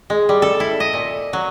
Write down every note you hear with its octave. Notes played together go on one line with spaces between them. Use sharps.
G#3
G3
A4
E4
D#5
A#2
F#3